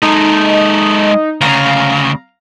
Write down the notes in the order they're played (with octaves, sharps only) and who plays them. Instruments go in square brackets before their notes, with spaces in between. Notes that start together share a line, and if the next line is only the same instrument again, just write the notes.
[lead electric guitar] G#3 A4 [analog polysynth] D#4
[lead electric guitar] D2 C#3 [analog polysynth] F5 A#5